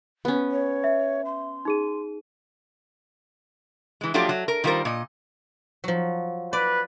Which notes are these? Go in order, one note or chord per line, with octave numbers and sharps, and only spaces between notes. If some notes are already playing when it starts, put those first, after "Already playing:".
B3 C#4
C#5
E5
C6
D#4 G#4 D#7
E3 G#3
F3 F#3 A3 F4 G4 D5
F#3
A#4
D#3 G3 F4 A4 A#4 C5
A#2 D#5
F3 F#3
B4 D5